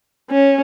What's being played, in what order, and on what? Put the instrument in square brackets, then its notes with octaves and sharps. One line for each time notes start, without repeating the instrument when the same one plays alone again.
[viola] C#4